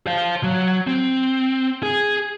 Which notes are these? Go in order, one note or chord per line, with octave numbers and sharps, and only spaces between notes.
C5 F5
F#3
C4
G#4